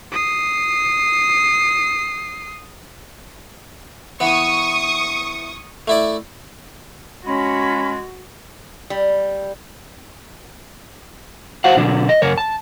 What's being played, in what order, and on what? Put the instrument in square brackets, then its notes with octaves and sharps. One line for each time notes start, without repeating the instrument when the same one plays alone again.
[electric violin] D#6 C7
[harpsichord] E3 B3 [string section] C#6 D#6
[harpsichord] A3 E4 D5
[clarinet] G#3 [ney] C#4 [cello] F#4 [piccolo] B5
[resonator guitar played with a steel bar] G3
[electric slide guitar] F#4 C5 F5 F#5
B2 D3 F#3 D4
D#5
F#2 C#3 A#4 C#5
A5